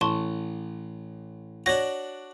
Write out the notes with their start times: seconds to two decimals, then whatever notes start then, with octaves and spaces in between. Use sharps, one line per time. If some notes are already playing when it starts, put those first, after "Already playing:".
0.01 A1 A5 C6 C#6
1.66 D4 F#4 C#5 A#6